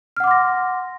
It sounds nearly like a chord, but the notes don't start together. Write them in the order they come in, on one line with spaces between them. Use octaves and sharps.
F6 F#5 D6 C6 A#6